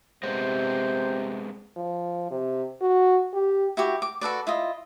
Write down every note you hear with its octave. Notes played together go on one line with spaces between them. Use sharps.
C3 G#3 B3 C4 C5
F3
C3
F#4
G4
E4 F#4 G4
D6
F#4 A4 B4 D5
E4 F4 D#5